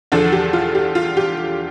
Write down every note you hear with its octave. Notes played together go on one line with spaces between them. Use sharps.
E2 D3 F3 A4
G4
F4
G4
F4
G4